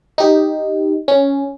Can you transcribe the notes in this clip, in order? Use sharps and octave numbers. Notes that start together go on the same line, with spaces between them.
D#4 G4
C#4